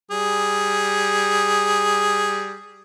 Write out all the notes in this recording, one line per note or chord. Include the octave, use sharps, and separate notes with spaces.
G3 G#4